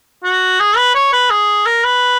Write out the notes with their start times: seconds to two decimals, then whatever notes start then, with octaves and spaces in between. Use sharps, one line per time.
0.24 F#4
0.60 G#4
0.77 B4
0.95 C#5
1.13 B4
1.31 G#4
1.66 A#4
1.84 B4